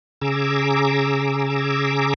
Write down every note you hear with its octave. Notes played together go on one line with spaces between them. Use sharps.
C#3 G#4 A#5 D6 E6